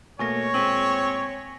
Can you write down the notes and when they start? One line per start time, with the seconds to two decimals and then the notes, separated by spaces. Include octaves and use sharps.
0.19 B2 A3 A#3 C#5 G#5 C#6 A#6
0.54 A#2 G#3 C4 B6 D#7 F#7